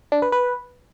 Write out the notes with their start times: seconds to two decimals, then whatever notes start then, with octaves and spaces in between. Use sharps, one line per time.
0.12 D4
0.22 B4
0.32 B4